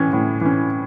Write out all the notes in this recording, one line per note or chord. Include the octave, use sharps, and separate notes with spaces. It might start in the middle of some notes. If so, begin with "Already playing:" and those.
Already playing: A2 E3 C#4
A2
E3 C#4